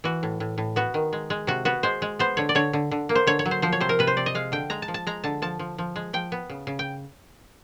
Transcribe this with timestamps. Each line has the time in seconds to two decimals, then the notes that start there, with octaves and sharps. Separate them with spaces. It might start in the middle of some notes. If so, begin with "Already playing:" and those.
0.04 E3 F#4
0.23 A2
0.40 A2
0.58 A2
0.76 B3 F#4
0.94 D#3
1.13 G#3
1.30 G#3
1.47 C3 F#4
1.65 B3 F#4
1.83 G#3 C5
2.02 G#3
2.19 B3 C5
2.37 D3 C#5
2.49 D5
2.55 D3 C#5
2.73 D3
2.91 D3
3.09 A#3
3.15 C5
3.27 D3 C#5
3.39 C#5
3.46 F#3
3.51 C5
3.62 F3 C5
3.72 C#5
3.81 C3 C5
3.89 A#4
3.99 C3 B4
4.07 C5
4.17 C3 D5
4.26 D#5
4.35 G#3 F5
4.52 D3 G5
4.70 G#3 A#5
4.82 A5
4.88 F3
4.94 A5
5.07 G#3 A#5
5.24 D3 A5
5.42 F3 A5
5.59 F3
5.78 F3
5.96 G#3
6.13 F3 G5
6.32 B3
6.50 C#3
6.67 C#3
6.79 G5